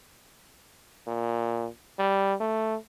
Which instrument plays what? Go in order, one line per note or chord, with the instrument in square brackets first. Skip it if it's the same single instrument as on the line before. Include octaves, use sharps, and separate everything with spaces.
[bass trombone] A#2
G3
A3